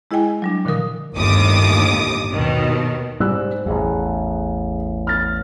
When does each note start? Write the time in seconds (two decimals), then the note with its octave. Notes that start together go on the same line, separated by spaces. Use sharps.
0.11 G#3 E4 G#4 D#5 G5 G#5
0.42 F#3 G3 D4
0.65 A#2 D3 D#3 F3 A#4 D#6
1.17 G1 D#2 A2 D6 D#6
2.33 D#2 B2 D#3
3.20 G#2 G3 E6 F#6
3.66 A1 E2 G#4
5.07 F6 A6